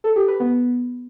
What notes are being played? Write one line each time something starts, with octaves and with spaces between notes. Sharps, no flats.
A4
G4
B4
B3